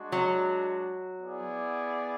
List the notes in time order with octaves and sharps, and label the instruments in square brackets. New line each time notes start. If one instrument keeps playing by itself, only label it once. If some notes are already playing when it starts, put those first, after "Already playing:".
Already playing: [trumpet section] G#3 D4 F#4
[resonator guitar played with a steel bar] F#3
[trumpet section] B3 E4 G#4 D5